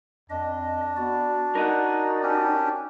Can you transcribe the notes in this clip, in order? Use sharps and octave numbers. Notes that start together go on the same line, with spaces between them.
F2 D4 D#5
B3 F#4 D5
D#4 A#4 D#5 F#5
C#4 D4 G4